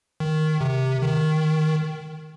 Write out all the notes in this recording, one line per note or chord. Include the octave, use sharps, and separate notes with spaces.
D#3
C3
D#3